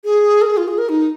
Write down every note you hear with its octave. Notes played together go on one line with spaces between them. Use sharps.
G#4
A#4
G#4
F4
G#4
A#4
D#4